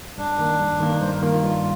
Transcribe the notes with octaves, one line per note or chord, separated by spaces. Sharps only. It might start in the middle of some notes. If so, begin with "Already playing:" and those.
G2 D4
D#3 A#3
G2
D#3 A#3
G2 C5
A#4
D#3 A#3 F4
F4
G2 F4